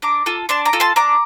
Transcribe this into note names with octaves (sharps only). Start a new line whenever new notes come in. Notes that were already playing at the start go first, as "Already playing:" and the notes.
D4 A#5 D6
F4 A4
D4 A5 C6
A#5 D6
F4 A4
A5 C6
D4 A#5 D6